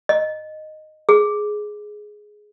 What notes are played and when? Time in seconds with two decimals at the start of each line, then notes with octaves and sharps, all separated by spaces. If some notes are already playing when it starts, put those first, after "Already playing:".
0.09 D#5
1.09 G#4